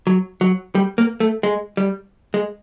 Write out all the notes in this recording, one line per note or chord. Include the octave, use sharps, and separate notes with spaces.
F#3
F#3
G3
A#3
A3
G#3
G3
G#3